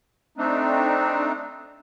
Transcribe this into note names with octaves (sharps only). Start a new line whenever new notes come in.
A3 C4 D4 D#4